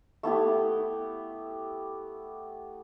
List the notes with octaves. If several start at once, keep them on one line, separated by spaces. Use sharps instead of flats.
A3 B3 E4 G4